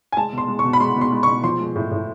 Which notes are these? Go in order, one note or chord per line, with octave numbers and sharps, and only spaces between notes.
G#5
G#3 A5
B2
C6
G#3
C#6
B2
B5
G#3 C6
B2
C6
G#3
B2 C#6
F3 C6
G#3
A2
A2